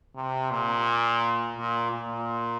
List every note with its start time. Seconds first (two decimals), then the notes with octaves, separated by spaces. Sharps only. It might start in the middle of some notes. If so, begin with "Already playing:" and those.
0.16 C3
0.51 A#2
1.57 A#2
1.91 A#2